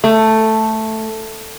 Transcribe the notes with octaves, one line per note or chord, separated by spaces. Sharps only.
A3